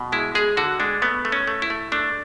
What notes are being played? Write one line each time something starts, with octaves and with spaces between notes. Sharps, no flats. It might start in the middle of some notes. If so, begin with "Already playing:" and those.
Already playing: B2
G#3 E4
G#3 G#4
D3 F#4
G#3 D4
A3 B3
A3
C#4
A3
E4
A3
A3 D4